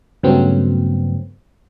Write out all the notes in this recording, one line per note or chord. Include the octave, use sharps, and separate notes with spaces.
G2 C#3 F#3 A3 B3 C4